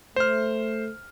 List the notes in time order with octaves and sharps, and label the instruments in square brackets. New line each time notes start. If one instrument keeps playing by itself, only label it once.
[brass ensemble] A3 [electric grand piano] C5 F6